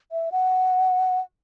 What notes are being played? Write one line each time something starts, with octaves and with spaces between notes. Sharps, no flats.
E5
F#5